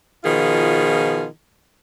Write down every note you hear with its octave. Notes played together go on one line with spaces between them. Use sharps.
B2 D#3 F3 F4 G#4